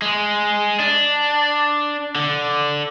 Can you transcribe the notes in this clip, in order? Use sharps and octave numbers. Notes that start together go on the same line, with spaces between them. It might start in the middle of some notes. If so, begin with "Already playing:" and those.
G#3
D4
D3